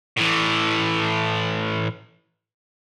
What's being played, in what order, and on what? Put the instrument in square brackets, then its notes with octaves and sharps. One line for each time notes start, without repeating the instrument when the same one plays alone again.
[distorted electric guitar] A2 E3